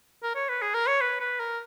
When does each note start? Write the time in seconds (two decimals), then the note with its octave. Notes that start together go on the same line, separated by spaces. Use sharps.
0.23 A#4
0.36 C#5
0.49 B4
0.62 G#4
0.74 A#4
0.87 C#5
1.01 B4
1.20 B4
1.40 A#4